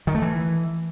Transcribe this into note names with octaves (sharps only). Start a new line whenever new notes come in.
D#3
A3
E3